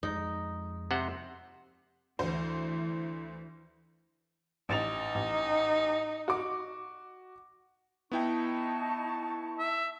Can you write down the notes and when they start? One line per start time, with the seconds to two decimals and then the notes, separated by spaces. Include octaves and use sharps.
0.03 F2 G#3 D#4
0.91 C3 C5 F#5
2.19 D2 E3 C5
4.69 A1 D#4 A6 F7
5.15 A1
6.28 F#4 D6
8.12 B3 D#4 E4 G5 A5 C#6
9.59 E5